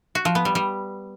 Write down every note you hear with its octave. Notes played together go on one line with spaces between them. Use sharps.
F#4
F3
B3
G3
G3